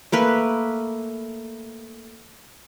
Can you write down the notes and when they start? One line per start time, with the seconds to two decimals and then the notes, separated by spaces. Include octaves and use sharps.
0.12 A3 A#3 B4